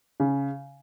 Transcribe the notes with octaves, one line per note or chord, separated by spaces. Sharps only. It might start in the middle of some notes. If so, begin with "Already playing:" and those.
C#3